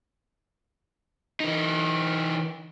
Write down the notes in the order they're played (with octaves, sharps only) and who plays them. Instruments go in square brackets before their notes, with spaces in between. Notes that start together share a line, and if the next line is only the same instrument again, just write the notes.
[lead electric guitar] E3 D#4